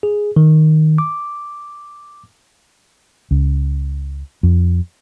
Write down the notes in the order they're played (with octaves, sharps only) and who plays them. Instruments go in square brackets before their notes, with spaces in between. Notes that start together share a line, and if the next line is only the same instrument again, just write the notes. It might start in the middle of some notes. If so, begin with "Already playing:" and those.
[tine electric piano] G#4
D#3
D6
[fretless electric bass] C#2
F2